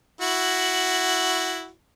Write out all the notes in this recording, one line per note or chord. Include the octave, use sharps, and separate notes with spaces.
E4 F#4